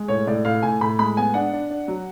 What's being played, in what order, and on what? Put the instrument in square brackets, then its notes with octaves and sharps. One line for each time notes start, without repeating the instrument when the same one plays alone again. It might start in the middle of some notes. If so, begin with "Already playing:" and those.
Already playing: [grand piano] G#3
A2 C#5
A2 D5
A2 F5
A2 G#5
A2 B5
G#3 B5
B3 G#5
D4 F#5
D4
D4
F#3